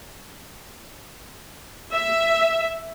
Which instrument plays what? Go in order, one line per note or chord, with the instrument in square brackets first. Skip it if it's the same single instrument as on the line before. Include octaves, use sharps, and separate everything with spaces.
[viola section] E5